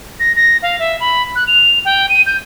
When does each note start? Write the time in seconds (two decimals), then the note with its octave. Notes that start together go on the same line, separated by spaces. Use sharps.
0.20 A#6
0.36 A#6
0.63 F5
0.79 E5
1.00 B5
1.36 F#6
1.47 F7
1.85 G5
2.09 D#7
2.26 G6